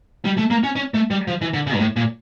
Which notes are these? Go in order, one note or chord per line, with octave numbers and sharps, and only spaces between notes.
G3
A3
A#3
C#4
C#4
A3
G3
F3
E3
D3
C#3
G2
A2
A#2